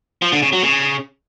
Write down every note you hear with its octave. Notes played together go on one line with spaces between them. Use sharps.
F3
D3
C#3
F#3
C#3